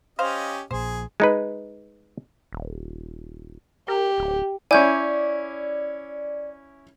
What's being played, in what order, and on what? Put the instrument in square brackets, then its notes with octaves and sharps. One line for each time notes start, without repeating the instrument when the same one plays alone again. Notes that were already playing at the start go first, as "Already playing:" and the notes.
[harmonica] C#4 G4 D#5 [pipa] C5 F5
[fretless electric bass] A#1 A#2 [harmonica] G#4 [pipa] C5
[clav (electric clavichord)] G#3 D#4 B4
[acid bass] D#1
[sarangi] G4 [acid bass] A#4
[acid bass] D1
[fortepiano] C#4 E4 [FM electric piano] D5 [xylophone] G#5 G6